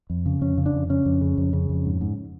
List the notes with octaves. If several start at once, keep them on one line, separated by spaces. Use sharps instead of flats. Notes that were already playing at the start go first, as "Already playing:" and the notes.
F2
C#3
F2 C#4
C#3
D4
F2
C#3 C#4
F2
C#3
F2
C#3
F2
G#2
G#2